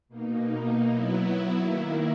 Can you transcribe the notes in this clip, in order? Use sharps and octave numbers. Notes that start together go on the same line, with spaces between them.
B2 A#3 D#4
F#3 B3 E4
D#3 A#3 E4